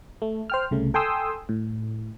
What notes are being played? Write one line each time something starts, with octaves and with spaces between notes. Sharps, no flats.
A3
C5 G5 F6
C2 C#3 A3
A4 G5 G#5 C6 D#6 E6
A2